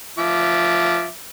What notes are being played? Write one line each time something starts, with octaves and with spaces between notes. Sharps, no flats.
F3 E5 D6